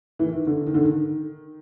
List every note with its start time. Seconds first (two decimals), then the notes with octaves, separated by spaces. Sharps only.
0.19 E3
0.26 D#3
0.47 D3
0.67 D#3
0.74 D3
0.83 D#3